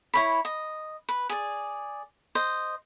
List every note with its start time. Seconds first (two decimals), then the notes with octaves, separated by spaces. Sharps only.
0.14 E4 C#5 B5
0.45 D#5
1.09 B4
1.29 G#4 D5
2.35 C5 D#5